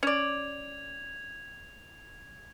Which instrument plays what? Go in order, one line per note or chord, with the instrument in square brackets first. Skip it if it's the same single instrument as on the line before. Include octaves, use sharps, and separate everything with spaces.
[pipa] C#4 D5 [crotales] G#6 F7